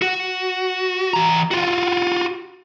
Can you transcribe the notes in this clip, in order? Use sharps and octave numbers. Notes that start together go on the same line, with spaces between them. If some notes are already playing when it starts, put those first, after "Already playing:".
F#4
E3 A#5
F4 F#4